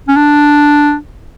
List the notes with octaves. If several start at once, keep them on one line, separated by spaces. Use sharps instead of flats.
C#4
D4